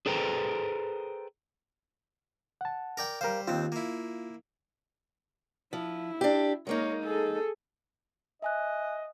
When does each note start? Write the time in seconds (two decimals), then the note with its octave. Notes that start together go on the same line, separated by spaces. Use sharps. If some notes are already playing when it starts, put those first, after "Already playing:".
0.06 G#4 A4 B4 C5 G5 A#5
2.61 F#5 A5
2.97 A#4 D5 G5
3.21 G3 A#4 C5 F5
3.48 D#2 C4 F4
3.72 A#3 E4
5.73 F3 E4
6.21 D4 G4
6.67 G#3 A#3 D#4 A#4 C#5
7.04 G#4 A4
8.42 D#5 E5 G#5 F#6